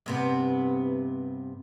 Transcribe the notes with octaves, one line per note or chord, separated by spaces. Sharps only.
G2 C3 B3